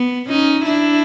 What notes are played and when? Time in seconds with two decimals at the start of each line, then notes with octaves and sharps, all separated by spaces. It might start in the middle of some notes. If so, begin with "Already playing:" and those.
Already playing: B3
0.29 C#4 D#4
0.66 D4 E4